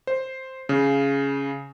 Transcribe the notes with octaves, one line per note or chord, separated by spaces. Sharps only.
C5
C#3